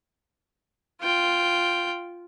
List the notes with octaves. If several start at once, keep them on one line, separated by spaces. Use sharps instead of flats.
F4 G5